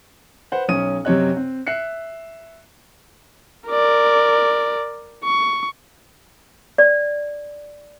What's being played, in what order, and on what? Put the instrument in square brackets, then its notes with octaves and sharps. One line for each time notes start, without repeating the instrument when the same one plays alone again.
[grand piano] B4 C5 F#5
B1 C#4 C#5 D#6 D#7
F#2 C3 C4 C#5 D#5 F#6
C4
E5 F#6 C7 C#7
[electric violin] A#4 D5
C#6
[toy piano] D5